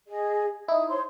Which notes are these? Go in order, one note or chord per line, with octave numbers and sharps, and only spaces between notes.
G#4 D#5
D#4 E4 D#6
C5 C#5 C6